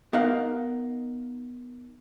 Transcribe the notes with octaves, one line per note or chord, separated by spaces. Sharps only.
B3 D#4 A#4 D#5 F5 F#5